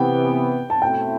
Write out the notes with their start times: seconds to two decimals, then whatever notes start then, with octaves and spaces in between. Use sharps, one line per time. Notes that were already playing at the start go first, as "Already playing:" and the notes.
Already playing: C3 E3 B3 G5
0.70 A5
0.82 B2 A3 C4 E4 G5